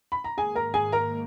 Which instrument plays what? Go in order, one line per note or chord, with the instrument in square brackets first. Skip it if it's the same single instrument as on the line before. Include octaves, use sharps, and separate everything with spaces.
[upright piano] B5
A#5
[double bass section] G#2 D#3 A#3 [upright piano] G#4 G#5
[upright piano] A#4 A#5
G#4 G#5
A#4 A#5